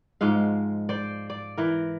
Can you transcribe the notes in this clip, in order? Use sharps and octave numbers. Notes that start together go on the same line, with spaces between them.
G#2 F3 G#3 F5
C5 D5
D5
E3 A#4